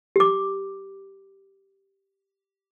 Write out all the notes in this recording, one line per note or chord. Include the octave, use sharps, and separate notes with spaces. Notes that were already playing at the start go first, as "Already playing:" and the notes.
G4 D6